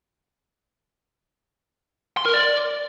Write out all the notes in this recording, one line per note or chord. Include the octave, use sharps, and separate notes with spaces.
C6
A#4
D5